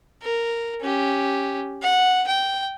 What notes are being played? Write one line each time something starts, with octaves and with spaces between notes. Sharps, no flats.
A#4
C#4 G4
F#5
G5